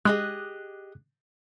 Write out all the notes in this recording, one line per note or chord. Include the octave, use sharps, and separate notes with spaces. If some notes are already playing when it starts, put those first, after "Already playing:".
G#3 G4 G#4 D#5 F#6